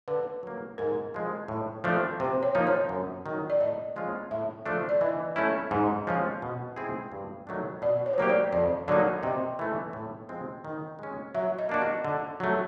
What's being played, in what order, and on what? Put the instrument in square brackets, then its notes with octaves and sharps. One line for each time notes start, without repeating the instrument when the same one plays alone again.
[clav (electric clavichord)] D3 [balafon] B4
[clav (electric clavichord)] F#3 A#3
[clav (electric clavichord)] G#2 [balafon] A#4
[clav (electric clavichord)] F3 G#3
A2
F3 A3 D4
[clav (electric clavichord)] C3 [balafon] C5
[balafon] C#5
[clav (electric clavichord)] F3 A#3 D#4
[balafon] C#5
[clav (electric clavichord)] F#2
D#3 F#3
[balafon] D5
[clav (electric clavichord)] A2 [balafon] D#5
[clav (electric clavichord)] F3 G#3 C#4 F4
[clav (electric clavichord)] A2 [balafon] E5
[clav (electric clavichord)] F3 A3 D4
[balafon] D5
[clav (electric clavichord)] E3 [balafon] D#5
[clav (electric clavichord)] A3 C#4 E4
[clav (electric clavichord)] G#2 [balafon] D#5
[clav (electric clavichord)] F3 G#3 C#4 F4
B2
G#3 C4 E4 G#4
G2
D#3 F#3 A3 D4
[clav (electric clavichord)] B2 [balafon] D5
[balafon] C#5
C5
[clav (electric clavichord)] F#3 A#3 D#4 G4 [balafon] C#5
[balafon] D5
[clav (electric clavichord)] F2 [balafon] D5
[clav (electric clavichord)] D3 F#3 A#3 D#4 [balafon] D5
[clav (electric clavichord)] C3 [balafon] D#5
[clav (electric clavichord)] E3 A3
A2
F3 G#3 C4
D#3
G#3 C#4
[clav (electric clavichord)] F#3 [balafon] E5
[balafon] D#5
[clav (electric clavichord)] A#3 D4 F#4
[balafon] D#5
[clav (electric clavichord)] D3
F#3 A3